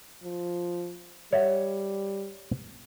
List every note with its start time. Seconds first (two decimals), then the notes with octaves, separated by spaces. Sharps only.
0.23 F3
1.33 G3 C#5 E5 F#5